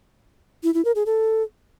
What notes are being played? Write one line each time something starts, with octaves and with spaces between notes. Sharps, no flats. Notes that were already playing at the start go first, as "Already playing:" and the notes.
E4
E4
A#4
G#4
A4